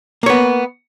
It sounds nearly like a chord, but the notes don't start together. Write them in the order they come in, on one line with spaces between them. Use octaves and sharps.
A#3 C#5 B3